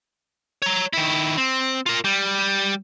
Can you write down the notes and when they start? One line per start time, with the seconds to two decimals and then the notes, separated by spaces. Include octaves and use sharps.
0.62 C#5 A#5
0.93 D#3 E4
1.37 C4
1.86 F4 A#4
2.04 G3